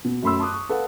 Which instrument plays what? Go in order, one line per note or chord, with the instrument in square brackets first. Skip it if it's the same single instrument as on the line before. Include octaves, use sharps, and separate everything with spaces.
[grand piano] B2
F#2 A3 B5 C6 E6
A5 C6 D6 D#6 F#6
C#6
A4 B4 F5 F#5